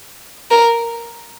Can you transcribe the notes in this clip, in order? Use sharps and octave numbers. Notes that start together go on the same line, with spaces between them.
A#4